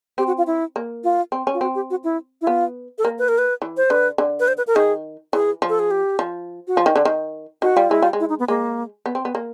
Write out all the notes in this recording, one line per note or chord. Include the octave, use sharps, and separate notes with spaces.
C4 G4
F#4
F4
E4
A#3
F4
C4
C#4
F4
C4 F#4
G4
F#4
E4
E4
B3 F4
A4
A#3 A#4
B4
A#4
B4
E3
C5
D3 B4
D3
B4
C5
B4
A#4
D#3 G#4
E3 G#4
F3
A4
G#4
G4
F3
F#4
F3 F4
D#3
D3
D#3
D#3 F#4
G3 F4
G#3 E4
G3 F4
G#3
E4
D#4
B3
G#3 A#3
B3
C4
B3
A#3